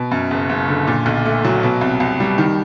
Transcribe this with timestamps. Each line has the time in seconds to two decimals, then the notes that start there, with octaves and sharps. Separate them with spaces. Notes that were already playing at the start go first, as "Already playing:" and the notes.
Already playing: B2
0.12 F#2
0.31 F#1
0.49 F#1
0.68 D3
0.87 A#2
1.06 B1
1.25 A3
1.45 F#3
1.63 B2
1.81 C2
2.00 C2
2.20 G3
2.38 D#3